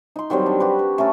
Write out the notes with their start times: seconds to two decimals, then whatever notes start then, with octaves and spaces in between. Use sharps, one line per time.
0.16 D#4 C6
0.30 D#3 F#3 G3 C4
0.46 D4
0.60 F#4 G4 B4
0.79 B4
0.98 A3 C#4 A4 A#4